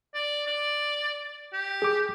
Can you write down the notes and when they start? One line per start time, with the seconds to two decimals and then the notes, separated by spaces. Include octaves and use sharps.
0.14 D5
0.47 D5
1.53 G4
1.82 G#4 D6